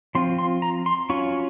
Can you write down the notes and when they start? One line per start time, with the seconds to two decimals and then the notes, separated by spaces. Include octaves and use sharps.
0.15 F3 C4 F4 C6
0.39 C6
0.62 A#5
0.86 C6
1.10 F#3 C#4 F4 C#6